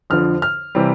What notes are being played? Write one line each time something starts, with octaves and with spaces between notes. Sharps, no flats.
F2 D3 F3 F6
F6
C3 E3 G3